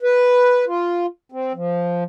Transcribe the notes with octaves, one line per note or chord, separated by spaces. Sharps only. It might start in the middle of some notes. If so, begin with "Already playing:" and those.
B4
F4
C4
F3